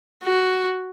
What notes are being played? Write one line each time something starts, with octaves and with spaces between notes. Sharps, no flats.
F#4